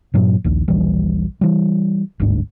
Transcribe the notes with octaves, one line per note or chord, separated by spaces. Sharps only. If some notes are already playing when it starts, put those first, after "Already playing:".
G2 A#2 F#3
A#1 D#2
D#1 A#1 E3 G3
E3 G3
G1 D2 G#2 D4